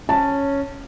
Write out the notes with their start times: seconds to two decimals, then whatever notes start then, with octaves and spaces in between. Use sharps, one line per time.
0.09 C#4 A5